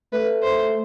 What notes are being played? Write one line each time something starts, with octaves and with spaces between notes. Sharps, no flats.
A3 B4
C5